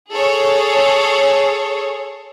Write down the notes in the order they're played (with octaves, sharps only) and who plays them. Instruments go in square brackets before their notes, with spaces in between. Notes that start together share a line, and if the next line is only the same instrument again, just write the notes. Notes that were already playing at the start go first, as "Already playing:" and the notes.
[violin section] G#4 A4 C#5